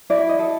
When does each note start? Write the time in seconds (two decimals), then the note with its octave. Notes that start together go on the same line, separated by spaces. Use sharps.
0.10 E4 D5
0.29 D#5
0.39 A4